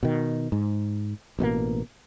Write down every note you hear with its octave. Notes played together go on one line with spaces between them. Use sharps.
B2 D#3
G#2
A1 B2 D#3 A#3